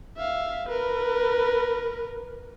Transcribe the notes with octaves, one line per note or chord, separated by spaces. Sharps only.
E5 F5
A#4 B4